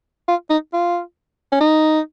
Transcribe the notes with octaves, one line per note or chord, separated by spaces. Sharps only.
F4
D#4
F4
C#4
D#4